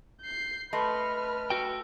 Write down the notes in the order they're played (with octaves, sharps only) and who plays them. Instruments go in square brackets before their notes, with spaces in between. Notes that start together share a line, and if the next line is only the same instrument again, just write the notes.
[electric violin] G6 C7
[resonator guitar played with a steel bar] A3 [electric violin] B4 F6 [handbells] D#5 B5 C6
[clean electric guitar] F#4 G5 [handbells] E6